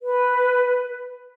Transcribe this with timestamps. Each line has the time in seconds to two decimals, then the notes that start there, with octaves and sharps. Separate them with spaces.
0.02 B4